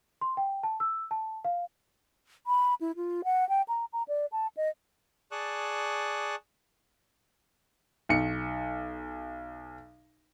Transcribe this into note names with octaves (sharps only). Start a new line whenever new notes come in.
C6
G5
A5
E6
A5
F5
B5
E4
F4
F#5
G5
A#5
A#5
D5
A5
D#5
G#4 D5 A5 C#6 D#6 F#6
B1 C#7